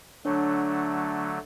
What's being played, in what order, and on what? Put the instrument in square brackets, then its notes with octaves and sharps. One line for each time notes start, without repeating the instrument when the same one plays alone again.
[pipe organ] D3 F#3 A3 [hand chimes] D4 C#5